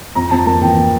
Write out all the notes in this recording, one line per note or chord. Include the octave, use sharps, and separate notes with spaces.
F2 A#5
F2 A5
A#3 A5
E3 G5